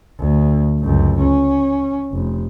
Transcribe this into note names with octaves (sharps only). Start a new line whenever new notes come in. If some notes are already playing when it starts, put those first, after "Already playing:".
D2
C#2 F#2
C#4
F1